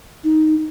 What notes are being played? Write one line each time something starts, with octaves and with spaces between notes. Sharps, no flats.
D#4